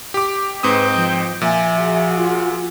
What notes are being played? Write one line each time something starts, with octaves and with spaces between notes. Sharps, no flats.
G4 D6
G#2 C4 B4 D#5 G5 D#6
F3
A#2 F3 E5 G#5
F#4 G#4
F4